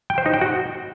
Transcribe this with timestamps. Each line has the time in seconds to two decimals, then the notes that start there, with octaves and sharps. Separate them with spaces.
0.10 G5
0.18 C5
0.26 D#4
0.34 G5
0.41 F#4